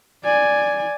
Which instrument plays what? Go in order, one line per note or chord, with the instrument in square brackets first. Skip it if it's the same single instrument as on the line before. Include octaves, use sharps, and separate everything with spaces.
[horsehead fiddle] D5 G#5